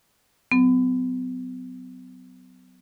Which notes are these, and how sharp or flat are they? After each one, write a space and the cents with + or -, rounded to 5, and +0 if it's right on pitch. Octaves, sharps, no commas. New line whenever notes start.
F#3 +0 B3 +45